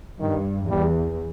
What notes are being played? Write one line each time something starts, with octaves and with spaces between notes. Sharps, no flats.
G2 D#3
E2 G3